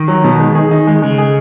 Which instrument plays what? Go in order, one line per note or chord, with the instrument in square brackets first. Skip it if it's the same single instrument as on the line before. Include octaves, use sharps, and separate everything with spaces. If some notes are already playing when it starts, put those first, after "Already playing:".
Already playing: [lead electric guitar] D#3
[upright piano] F#3
B2
G#3
G#4
D#4
G#3
[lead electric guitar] C#3 [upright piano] G#3
[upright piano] G#4